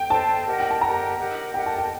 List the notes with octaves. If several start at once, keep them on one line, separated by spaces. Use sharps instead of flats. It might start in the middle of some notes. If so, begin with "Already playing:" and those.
Already playing: G5
A4 C5 D#5 A5
G4 A#4 D#5 F#5
G5
A5
G4 A#4 D#5 F#5 A#5
G4 A#4 D#5 F#5
G4 A#4 D#5 F#5 G5
A5
G5